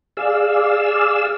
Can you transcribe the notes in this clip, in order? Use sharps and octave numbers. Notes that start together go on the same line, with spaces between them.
G#4 D5 F5 E6